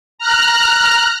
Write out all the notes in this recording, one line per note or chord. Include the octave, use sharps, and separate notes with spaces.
A#5 F6 F#6